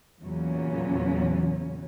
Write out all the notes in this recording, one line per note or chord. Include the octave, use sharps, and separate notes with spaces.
E2 A#2 C#3 F#3 C#4